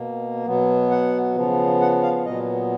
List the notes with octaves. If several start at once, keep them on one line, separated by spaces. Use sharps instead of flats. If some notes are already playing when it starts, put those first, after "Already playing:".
Already playing: B2 A#3
B2 F#3 B3
F#5
C#3 F3 B3
F#5
F5
A#2 F#3 B3 D#5